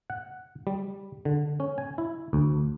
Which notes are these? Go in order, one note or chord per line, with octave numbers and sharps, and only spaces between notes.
F#5
G3
D3
C#4
G#5
E4
D2